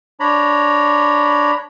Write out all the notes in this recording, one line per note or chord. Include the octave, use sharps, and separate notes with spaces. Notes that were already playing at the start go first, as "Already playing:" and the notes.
D4 C#5 A#5 B5